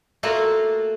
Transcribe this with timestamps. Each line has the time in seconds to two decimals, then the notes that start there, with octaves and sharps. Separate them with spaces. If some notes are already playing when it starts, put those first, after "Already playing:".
0.23 A3 A#3 F4 F#4